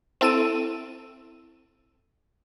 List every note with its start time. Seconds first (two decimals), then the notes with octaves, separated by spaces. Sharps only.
0.21 C4 E4 A4 E6 D7 D#7